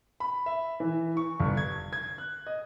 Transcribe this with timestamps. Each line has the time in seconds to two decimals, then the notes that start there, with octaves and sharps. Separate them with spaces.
0.20 B5
0.46 E5
0.80 E3
1.17 C#6
1.40 G1
1.57 G#6
1.93 G#6
2.18 F#6
2.47 D#5